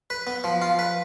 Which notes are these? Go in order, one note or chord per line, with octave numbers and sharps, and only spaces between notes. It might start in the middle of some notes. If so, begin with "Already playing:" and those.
B4
B3
F3
F4
B4